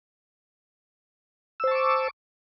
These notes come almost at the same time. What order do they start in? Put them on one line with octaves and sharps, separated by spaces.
E6 C5 A5 C#6 D6